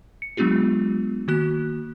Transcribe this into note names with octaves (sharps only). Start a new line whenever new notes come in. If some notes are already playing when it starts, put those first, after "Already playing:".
C#7
F#3 G#3 B3 D4 F4 G4
D#3 A#3 F#4 F#6